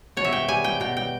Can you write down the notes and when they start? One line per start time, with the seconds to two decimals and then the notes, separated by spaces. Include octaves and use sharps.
0.17 B2 C#5
0.25 E5
0.32 G5
0.48 G3 G#5
0.64 G5
0.80 B2 G5
0.97 G5